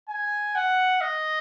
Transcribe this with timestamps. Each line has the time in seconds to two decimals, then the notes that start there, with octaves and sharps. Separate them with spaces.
0.09 G#5
0.55 F#5
1.01 D#5